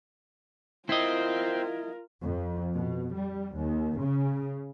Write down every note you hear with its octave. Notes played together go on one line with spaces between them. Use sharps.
C4 E4 F4 A#4 D#5
F2
B2
G3
D#2
C#3